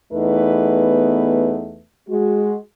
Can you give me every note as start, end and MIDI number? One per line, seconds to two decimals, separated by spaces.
0.13 1.80 40
0.13 1.80 57
0.13 1.80 59
0.13 1.80 63
0.13 1.80 71
2.09 2.55 56
2.09 2.55 66